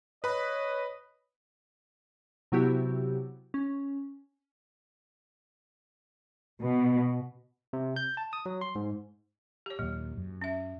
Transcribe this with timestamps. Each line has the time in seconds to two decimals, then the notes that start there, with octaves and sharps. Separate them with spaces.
0.24 B4 C#5 D#5 B5
2.52 C3 F#3 B3 E4 F#4 G4
3.54 C#4
6.61 B2
7.73 C3
7.96 G6
8.17 A5
8.33 D#6
8.46 F#3
8.61 C6
8.75 G#2
9.66 G4 C#5
9.79 D#2 A#2 F#3
10.17 F#2
10.41 C#4 E5